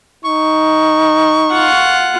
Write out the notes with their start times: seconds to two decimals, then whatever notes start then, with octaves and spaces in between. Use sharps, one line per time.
0.24 D#4 C#6
1.51 F4 F#5